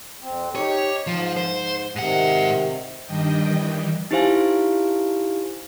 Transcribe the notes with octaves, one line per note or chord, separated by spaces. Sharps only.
F2 C4
D#4 G4 C#5
G#2 F3
C5
G#2 C3 D#3 F#5
G2 D#3 G3 D4 D#5 G5
D#3 E3
D#4 E4 G4 C5 F5 G#5